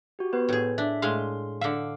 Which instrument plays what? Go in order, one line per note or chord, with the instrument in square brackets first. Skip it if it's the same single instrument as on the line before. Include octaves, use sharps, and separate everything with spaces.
[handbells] F#4 G4
B3 B4 C5
[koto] A2 G#4
[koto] D4 [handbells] E5
[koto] A2 G#3 F5 [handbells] C6
[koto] D3 E5 [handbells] F5 D6